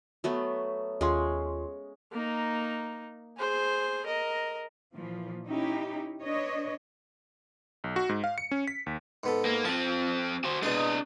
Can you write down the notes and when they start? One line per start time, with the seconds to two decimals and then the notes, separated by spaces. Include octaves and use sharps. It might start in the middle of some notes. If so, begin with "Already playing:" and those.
0.24 F#3 A3 B3
1.01 D#2 G#3 C#4 F4 C6
2.12 A#3 D#4
3.37 G#4 C5
4.05 A#4 D#5
4.95 A#2 E3 F3
5.46 C#4 D#4 E4 G4
6.21 D4 B4 C#5 D#5
7.84 B1
7.96 F#4
8.09 G#2
8.24 F5
8.38 C#7
8.51 C#4
8.67 B6
8.86 D#2
9.24 G#2 B3 A4
9.46 A#3
9.65 F3 C4 A5
10.45 F#4 C5
10.63 B2 G#3 D4 G#4 D#5